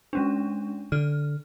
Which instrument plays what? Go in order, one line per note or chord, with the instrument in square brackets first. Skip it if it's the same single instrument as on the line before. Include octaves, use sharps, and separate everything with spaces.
[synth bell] G#3 C#4 D4
[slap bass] D3 [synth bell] F6